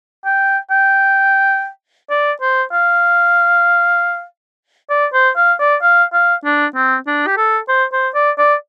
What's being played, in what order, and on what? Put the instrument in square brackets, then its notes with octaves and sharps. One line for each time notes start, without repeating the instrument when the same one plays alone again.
[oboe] G5
G5
D5
C5
F5
D5
C5
F5
D5
F5
F5
D4
C4
D4
G4
A4
C5
C5
D5
D5